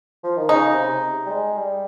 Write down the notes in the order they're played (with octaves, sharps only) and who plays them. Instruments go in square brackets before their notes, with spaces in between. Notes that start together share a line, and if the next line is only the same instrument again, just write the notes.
[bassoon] F3
D#3
[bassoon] C#3 [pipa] D#4
[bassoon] C3
G3
G#3
G3